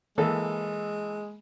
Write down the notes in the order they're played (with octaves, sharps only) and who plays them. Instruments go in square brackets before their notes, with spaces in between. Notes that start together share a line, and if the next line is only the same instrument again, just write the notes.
[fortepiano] E3 A#3 A4 [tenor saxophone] G#3